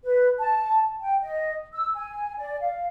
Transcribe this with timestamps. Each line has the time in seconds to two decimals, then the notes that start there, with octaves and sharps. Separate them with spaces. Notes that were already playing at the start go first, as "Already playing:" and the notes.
0.04 B4
0.40 A5
1.01 G5
1.22 D#5
1.74 E6
1.94 G#5
2.37 D5
2.59 F5